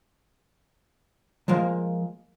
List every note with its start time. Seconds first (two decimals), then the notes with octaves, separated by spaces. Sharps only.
1.48 F3 G#3 A#3